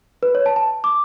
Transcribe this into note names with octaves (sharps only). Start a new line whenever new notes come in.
B4
C#5
A5
A5
D6